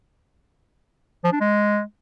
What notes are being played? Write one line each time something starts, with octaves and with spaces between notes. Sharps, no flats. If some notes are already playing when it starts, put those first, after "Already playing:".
F3
D4
G#3